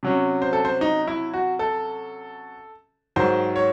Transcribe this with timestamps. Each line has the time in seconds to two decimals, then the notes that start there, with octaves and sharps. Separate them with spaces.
0.03 C3 F#3 C#4
0.42 C5
0.53 A4
0.65 C5
0.81 D#4
1.08 E4
1.34 F#4
1.59 A4
3.16 G#2 D#3 F#3 C5
3.56 C#5